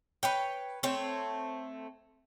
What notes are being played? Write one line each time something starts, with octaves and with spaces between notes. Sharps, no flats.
B4 C#5 G5
A3 C4 C#5